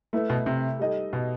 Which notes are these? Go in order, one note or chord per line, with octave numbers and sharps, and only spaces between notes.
A3 E4 B4 E5
B2
C3
G3 D#4 A4 D#5
B2